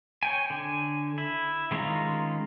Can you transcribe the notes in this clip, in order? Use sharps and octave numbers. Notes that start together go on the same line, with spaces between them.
C#5 G5 G#5
D3 G#5
E4
D#3 G#3 C#4 F4 A#5